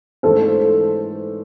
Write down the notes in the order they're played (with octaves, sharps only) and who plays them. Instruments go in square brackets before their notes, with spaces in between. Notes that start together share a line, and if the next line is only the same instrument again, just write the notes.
[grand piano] G#2 E3 A3 D4 F4 [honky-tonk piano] A4 C5